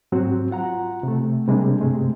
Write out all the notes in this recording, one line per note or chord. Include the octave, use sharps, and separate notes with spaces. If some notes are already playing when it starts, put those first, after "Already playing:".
G#2 F#3 C4 F#4
F4 F#5 A#5
C3 A3
C3 G3 G#3 A#3 D4
G2 C3 G#3 A3